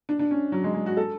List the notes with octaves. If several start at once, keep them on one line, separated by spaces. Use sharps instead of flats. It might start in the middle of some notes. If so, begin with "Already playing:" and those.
D4
D4
C#4
F#3
G#3
G#3
F#4
A4